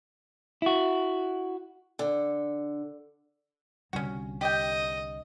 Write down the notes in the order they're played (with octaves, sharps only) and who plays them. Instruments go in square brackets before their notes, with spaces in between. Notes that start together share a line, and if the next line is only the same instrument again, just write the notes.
[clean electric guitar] E4 F#4
[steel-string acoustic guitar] D3
[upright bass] C2 D3 [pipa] C#4 F#4
[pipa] G4 G5 [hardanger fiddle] D#5